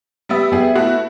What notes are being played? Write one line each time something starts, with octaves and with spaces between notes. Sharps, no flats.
G3 B3 E5
B3 G4 G#4 E5 F#5
A3 E4 F#4